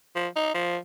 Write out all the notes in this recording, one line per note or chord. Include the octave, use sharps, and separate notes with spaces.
F3
D#4
F3